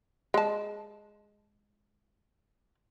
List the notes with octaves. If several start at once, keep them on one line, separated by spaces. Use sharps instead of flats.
G#3 A5